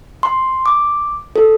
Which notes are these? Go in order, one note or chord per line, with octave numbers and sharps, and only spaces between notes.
C6
D6
A4